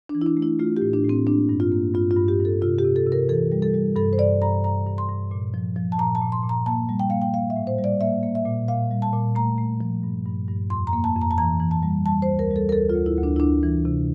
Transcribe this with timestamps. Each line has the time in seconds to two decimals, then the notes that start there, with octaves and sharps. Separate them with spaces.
0.09 D4
0.15 E3
0.21 E4
0.26 D4
0.37 A3
0.42 E4
0.60 A3 F4
0.77 G4
0.82 A2
0.93 D4
1.05 A2 C4
1.27 A#3 D4
1.49 G2
1.60 F4
1.72 A#3
1.94 G2 F4
2.11 F4
2.16 G2
2.28 G4
2.39 G2
2.45 A4
2.62 C3 F4
2.79 G4
2.84 C3
2.96 A4
3.06 C3
3.12 A#4
3.29 E3 A4
3.52 G3
3.62 A4
3.74 G3
3.96 G2 A4
4.13 C5
4.19 G2 D5
4.42 G2 A#5
4.64 G2 A#5
4.87 G2
4.98 C6
5.09 G2
5.31 A#2
5.54 F3
5.76 F3
5.92 A5
5.99 A#2 A#5
6.15 A5
6.22 A#2
6.32 C6
6.43 A#2
6.49 A#5
6.66 A#3 A5
6.89 G3
6.99 G5
7.10 A#3 F5
7.22 G5
7.34 A#3 F5
7.50 E5
7.56 A2
7.67 C5
7.78 G3
7.84 D5
8.01 A#3 E5
8.23 A#3
8.35 E5
8.46 A#2
8.68 A#2 F5
8.91 G3
9.02 A5
9.13 A#2
9.35 A3 A#5
9.58 A3
9.81 F3
10.03 G2
10.26 G2
10.48 G2
10.70 F2 C6
10.87 A#5
10.93 A#3
11.04 A5
11.16 F2
11.22 A#5
11.31 A5
11.38 E3 A#5
11.60 E3
11.71 A5
11.83 G3
12.06 G3 A5
12.22 D2 C5
12.39 A#4
12.51 G3
12.56 A4
12.69 A#4
12.72 D2 A4
12.89 F4
12.95 D2
13.06 E4
13.17 D2
13.23 D4
13.36 E4
13.40 D2 D4
13.63 E3
13.85 C3